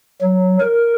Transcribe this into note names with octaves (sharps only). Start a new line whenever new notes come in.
F#3
A#4